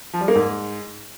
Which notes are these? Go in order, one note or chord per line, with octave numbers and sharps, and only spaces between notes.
F3
G3
A#3
G#2